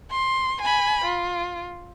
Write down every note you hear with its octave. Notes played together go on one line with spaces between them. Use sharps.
C6
G#5 B5
F4